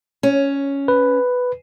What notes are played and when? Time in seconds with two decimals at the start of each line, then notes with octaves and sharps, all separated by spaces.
0.23 C#4
0.88 B4